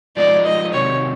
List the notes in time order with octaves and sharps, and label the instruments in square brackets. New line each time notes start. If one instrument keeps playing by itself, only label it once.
[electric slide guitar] F3 G#3 B3 D#4 [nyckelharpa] D5
[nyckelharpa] D#5
[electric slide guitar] C3 D#3 F#3 [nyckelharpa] C#5